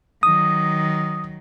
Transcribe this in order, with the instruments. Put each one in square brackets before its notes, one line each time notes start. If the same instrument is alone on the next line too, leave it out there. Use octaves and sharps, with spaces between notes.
[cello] D#3 F#3 [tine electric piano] D#6